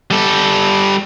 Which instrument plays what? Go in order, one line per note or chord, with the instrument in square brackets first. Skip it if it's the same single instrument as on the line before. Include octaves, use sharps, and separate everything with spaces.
[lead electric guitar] G3 A4